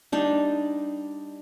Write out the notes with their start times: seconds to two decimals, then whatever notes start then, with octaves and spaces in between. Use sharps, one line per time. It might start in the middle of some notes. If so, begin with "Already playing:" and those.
0.12 G3 D4 D#4